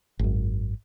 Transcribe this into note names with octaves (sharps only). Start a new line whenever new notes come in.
G#1 F#2